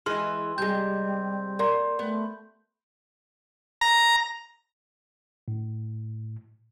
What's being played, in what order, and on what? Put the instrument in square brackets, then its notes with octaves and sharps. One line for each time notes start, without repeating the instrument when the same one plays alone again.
[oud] E3 G#3 [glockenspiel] C6 [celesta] F6
[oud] C3 G#3 [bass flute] G3 [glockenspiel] G6
[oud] A#3 [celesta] A#4 D5 C6
[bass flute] A3 [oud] B3
[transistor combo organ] A#5
[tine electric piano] A2